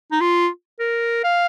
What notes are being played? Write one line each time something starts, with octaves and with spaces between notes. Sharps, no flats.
D#4
F4
A#4
F5